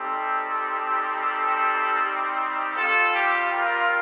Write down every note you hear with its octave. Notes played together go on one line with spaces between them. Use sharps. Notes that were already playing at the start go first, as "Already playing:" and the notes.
Already playing: G3 C4 D#4 G4 A4
A4
A4
G4
G3 C4 F4 A4
G4
A#4